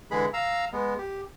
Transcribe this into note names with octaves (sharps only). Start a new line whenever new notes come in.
D3 E3 G#3 G#4 B5
F5 A#5 E6
G#3 B3
G4